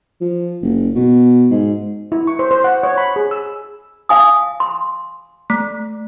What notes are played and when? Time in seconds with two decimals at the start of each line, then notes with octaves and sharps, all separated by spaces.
0.21 F3
0.62 F#1
0.95 B2
1.50 G#2
2.12 E4
2.27 C#6
2.39 C5
2.51 C5
2.64 F#5
2.83 C#5
2.98 B5
3.16 G#4
3.31 E6
4.09 F5 G#5 D#6
4.60 C6
5.50 A3